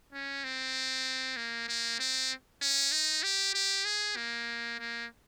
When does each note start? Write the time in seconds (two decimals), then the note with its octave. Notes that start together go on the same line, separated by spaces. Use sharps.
0.13 C#4
0.44 C4
1.37 A#3
1.68 A#3
1.99 C4
2.62 C#4
2.92 D#4
3.23 G4
3.55 G4
3.85 G#4
4.16 A#3
4.79 A#3